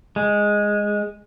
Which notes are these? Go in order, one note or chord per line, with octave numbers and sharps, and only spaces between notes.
G#3